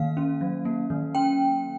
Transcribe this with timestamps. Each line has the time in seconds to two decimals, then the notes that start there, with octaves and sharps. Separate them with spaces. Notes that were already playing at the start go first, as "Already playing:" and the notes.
Already playing: D#3 A#3 F5
0.17 C#4
0.41 F#3
0.65 A#3
0.90 D#3
1.15 C#4 G5